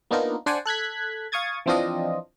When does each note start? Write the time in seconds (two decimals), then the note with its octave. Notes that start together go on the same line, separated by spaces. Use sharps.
0.11 A#3 B3 D4 D#4 F4 A#4
0.46 D4 C5 D5 F#5 G#5
0.65 A4 F#6 G#6 B6
1.32 F5 C#6 D#6 G#6 A6
1.66 E3 F3 C4 D4 F4 D#5